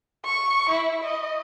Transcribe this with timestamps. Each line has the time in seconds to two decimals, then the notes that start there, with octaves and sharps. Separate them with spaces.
0.24 C#6
0.69 E4
1.04 D#5